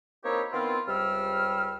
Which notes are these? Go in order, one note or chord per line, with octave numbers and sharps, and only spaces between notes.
A#3 C4 D#4 E4 G4 C#5
D#3 B3 C4 E4 F4
C#2 C3 G3 E6 F6